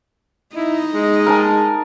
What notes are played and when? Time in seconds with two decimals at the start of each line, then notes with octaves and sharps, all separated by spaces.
0.55 D#4 E4 D#5
0.93 G#3
1.26 A#4 G#5 A5